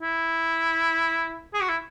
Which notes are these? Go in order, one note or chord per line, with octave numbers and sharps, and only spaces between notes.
E4
G#4
F#4
E4